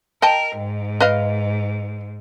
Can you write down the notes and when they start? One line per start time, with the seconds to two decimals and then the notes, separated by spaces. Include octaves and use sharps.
0.22 A#4 D#5 G5 A5
0.57 G#2
1.00 B4 D#5 F5